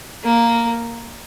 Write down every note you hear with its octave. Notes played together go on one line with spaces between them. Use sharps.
A#3